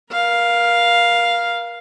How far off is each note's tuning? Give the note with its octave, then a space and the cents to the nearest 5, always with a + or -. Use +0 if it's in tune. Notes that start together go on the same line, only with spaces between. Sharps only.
A#4 +35 F5 +0